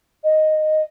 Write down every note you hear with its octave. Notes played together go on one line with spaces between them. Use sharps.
D#5